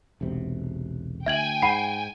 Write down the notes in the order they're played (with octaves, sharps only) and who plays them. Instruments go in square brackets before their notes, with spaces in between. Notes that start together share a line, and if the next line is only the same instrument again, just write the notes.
[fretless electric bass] E1 B1 C3
[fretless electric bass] D2 [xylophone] E5 G#6 F#7 [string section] G5 G#5
[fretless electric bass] G#2 [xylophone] F#5 B5 C7